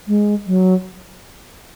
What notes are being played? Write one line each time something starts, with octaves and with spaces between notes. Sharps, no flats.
G#3
F#3